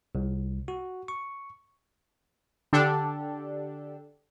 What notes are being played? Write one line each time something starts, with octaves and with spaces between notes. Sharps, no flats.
C2
F#4
C#6
D3 D4 G4 A4